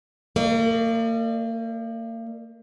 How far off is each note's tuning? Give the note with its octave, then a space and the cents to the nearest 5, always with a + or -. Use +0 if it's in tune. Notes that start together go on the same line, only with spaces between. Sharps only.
A#3 -40 A#4 +15 D5 +40